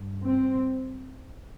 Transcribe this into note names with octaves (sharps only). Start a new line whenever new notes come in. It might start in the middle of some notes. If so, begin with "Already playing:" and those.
Already playing: G2
C4